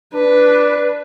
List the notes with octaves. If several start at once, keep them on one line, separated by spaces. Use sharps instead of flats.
D4 B4